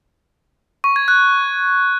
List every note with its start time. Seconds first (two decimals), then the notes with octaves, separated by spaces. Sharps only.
0.84 C#6
0.96 G#6
1.08 F#6